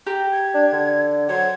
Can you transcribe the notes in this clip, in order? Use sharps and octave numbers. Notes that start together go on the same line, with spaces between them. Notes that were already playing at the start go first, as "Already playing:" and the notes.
G4 A#5
G#6
D4
D3
F#3 C5 G#6